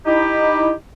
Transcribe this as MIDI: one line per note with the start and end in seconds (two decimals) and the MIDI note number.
0.06 0.72 63
0.06 0.72 64
0.06 0.72 67